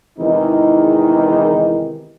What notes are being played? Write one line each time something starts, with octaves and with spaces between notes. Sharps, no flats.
E2 C3 D#3 E3 G#3 D#4